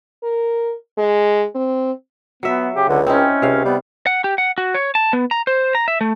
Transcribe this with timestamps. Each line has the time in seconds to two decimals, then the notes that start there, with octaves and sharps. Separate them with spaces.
0.23 A#4
0.98 G#3
1.55 C4
2.43 F#3 B3 E5
2.76 C#3 G4
2.89 C#2 D3
3.07 C4 C#4 D#4 E4
3.42 C#2 C3 F5
3.65 G3 B3
4.07 F#5
4.24 G4
4.38 F#5
4.58 F#4
4.74 C#5
4.95 A5
5.13 B3
5.31 A#5
5.47 C5
5.75 A#5
5.88 E5
6.01 A3